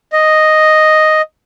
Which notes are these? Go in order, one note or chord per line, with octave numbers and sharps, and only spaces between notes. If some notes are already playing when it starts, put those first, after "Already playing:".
D#5